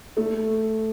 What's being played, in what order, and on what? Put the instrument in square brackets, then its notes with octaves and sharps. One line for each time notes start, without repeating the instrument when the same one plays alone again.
[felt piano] A3